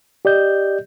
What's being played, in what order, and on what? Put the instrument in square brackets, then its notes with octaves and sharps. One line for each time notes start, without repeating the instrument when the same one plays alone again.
[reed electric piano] G4 D5 D#5 G6